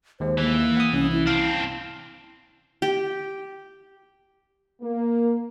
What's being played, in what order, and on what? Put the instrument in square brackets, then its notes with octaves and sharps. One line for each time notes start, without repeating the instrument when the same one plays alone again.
[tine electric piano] D#2 G#3 [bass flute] C5
[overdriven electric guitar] E3 [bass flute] A#3
[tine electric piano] F#5 D#6
[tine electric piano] C2 [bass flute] C#4
[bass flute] E4
[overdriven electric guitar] C4 D4 [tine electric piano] F5
[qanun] G4
[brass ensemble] A#3